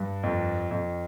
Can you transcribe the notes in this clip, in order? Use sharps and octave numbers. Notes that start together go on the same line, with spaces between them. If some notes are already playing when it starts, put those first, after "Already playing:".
Already playing: G2
F2
F2